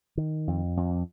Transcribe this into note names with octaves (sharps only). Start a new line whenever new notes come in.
D#3
F2
F2